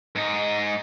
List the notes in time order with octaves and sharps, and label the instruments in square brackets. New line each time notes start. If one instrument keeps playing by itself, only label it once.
[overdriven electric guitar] G#2 D#4